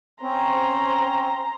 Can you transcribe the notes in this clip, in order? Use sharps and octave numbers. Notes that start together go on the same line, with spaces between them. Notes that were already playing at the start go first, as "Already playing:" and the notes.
C4 C#4 C5 A#5